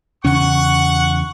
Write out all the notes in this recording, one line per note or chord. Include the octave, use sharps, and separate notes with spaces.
E2 C#3 C#4 F#5 C#6